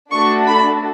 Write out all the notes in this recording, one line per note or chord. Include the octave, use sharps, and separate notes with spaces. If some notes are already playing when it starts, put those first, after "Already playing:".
A3 D4 F#4 A4 C#6
B5